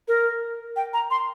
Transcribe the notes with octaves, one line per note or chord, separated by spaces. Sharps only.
A#4
G5
A#5
C6